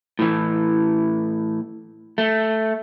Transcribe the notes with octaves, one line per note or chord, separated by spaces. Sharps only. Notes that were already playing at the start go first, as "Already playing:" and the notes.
A2 E3
A3